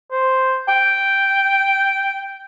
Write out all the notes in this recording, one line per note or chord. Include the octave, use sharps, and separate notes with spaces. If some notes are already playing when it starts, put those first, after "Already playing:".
C5
G5